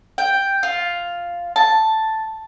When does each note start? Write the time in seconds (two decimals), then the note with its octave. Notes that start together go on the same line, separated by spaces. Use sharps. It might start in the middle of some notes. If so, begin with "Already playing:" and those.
0.18 G5
0.63 F4
1.56 A5